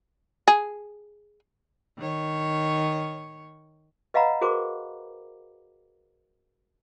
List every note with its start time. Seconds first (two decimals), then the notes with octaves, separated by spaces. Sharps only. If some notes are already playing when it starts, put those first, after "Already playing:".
0.48 G#4
1.98 D#3 C#5
4.14 B4 D#5 F5 F#5 A#5 B5
4.41 F#4 G#4 A#4 C5 D6